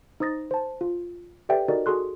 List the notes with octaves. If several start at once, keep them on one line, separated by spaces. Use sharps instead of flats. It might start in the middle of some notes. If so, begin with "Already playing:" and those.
D#4 C5 D#6 A6 A#6
C5 A5
F4
G4 A4 B4 D5 E5 G5
D#4 F#4 A4 A#4 D5 D#5
F#4 G#4 A4 C6 F#6